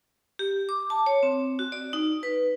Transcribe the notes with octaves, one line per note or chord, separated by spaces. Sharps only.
G4
D6
A5
C#5
C4
F#4
D5
D#4
B4